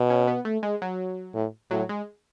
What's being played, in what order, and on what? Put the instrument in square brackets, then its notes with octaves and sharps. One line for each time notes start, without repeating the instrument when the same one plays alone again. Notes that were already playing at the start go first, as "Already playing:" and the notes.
Already playing: [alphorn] B2
[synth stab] C#4
B3
A3
G#3
F#3
[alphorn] A2
[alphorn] A2 [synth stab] F#3
[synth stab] G#3